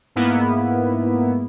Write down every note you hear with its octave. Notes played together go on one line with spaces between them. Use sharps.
G#2 A#3 B3 E4